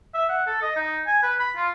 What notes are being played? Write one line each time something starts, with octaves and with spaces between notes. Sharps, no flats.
E5
F#5
A4
D#5
D#4
G#5
B4
B5
F4